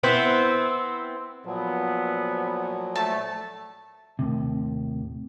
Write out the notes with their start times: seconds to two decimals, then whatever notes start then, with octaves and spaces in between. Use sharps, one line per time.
0.03 B3 C4 E4 C5
1.46 A#2 F3 F#3 B3
2.96 A3 A5
4.19 D#2 A2 C3